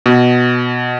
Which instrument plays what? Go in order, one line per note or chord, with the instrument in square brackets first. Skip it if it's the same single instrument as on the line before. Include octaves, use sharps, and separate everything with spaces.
[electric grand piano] B2